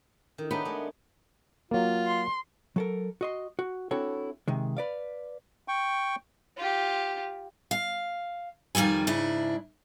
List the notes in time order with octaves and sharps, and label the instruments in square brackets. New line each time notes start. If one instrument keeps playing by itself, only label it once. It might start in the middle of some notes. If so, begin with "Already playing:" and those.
[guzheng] D#3 [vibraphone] D4 E4 A4
[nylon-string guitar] B3 [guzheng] D4 D#4 G4 [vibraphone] C#5 E5 A#5
[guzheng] G#3 A3 [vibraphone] A#4 D5
[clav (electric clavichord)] F#3 A#3 [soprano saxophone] F4
[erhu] C6
[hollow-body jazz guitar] F#3 A4 A#4
F#4 D#5 C6
F#4
C4 D4 E4 F#4 A4 C#5
C3 D#3 G#3
B4 D5 F5
[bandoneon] G5 C#6
[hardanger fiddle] F4 G4
[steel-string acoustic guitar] F5
F2 D#3 G3 F4 G#5
G#2 C#3 D4 E4